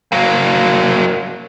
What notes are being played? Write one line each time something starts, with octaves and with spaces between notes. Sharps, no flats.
F#3 A#3